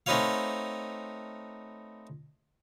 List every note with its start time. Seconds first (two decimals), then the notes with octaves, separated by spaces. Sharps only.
0.06 A3 C4 D#4 B4 C#5 F5